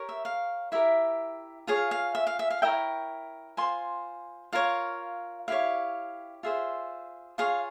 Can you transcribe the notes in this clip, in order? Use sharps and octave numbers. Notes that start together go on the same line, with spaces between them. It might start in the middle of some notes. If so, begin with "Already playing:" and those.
Already playing: G4 A#4 C#5
E5
F5
E4 G4 A#4 E5
F4 G#4 C#5 F5
F5
E5
F5
E5
F5
E4 A#4 C#5 E5 G5
F4 C5 G#5 C6
F4 A#4 C#5 F5
E4 G4 C#5 F5
F4 G#4 C5 E5
F4 G#4 C#5 F5